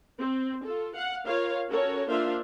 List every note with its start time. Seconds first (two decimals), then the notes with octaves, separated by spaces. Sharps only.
0.18 C4
0.64 F4 A4
0.95 F5 F#5
1.26 F4 A#4 C#5 F5
1.68 C#4 F#4 A4 A#4 C#5
2.08 A#3 D4 F4 C5 E5 F5